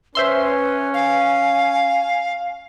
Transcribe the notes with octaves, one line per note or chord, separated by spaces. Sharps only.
C#4 B4 C5 E5 C6
F5 G#5